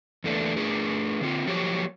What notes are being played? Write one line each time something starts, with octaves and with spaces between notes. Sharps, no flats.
E2 A3 A#3 D4
A3 D4 G#4 A#4
D3 C4 F4
F3 F#3 A#3 G4 C#5